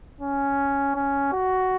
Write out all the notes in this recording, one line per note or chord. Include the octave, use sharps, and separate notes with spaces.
C#4
C#4
F#4